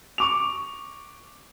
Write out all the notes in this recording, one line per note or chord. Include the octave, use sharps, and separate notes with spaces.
C#6 D6 F7